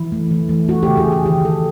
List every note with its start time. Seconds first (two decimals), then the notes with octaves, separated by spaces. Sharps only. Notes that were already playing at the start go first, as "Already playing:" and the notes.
Already playing: E3 E4
0.12 A3
0.31 E3
0.49 A3
0.68 A3 F#4
0.83 C#3 G4
0.97 G#4
1.07 E3
1.12 G#4
1.26 D#3 G4
1.44 D#3 A4